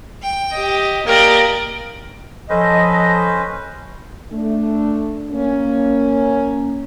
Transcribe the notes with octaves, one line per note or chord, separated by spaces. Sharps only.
G5
G4 D#5
A#3 G4 A#4 D5 D#5
F3 C#4 A4 B4 C5 D#5
A3 D4
A#3 C#4